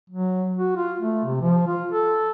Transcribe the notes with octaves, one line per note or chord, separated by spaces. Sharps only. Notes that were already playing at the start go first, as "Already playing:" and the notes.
F#3
F#4
F4
A3
C3
F3
F4
A4